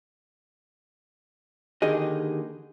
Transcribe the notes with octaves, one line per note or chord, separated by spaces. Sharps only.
D#2 D3 D#3 G4 G#4 D#5